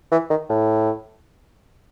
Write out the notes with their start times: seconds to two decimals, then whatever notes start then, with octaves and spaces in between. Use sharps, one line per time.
0.11 E3
0.30 D#3
0.50 A2